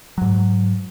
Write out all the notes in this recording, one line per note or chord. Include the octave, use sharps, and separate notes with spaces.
G#2 F#3